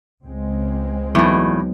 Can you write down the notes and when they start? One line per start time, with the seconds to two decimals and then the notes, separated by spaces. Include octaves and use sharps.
0.23 C#2 G#3 C4
1.15 E2 A2 F#3 B3 D#4